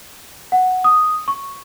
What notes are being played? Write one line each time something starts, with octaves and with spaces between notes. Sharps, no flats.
F#5
D#6
C#6